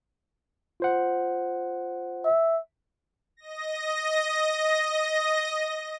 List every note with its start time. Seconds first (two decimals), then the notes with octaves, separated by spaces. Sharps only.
0.80 F4 C5 F#5
2.25 E5
3.37 D#5 A#6